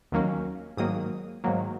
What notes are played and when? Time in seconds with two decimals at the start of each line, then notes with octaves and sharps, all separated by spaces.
0.12 D#2 D#3 F#3 A#3 C#4
0.77 G#2 D#3 F#3 A#3 D#6
1.44 G#2 D#3 F#3 A#3